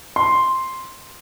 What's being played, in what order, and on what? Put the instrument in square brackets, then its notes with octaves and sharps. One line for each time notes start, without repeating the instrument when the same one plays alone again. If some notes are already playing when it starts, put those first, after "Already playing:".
[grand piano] C6